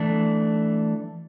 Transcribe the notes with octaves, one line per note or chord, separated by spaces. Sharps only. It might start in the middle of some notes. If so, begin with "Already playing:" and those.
Already playing: E3 A3 D4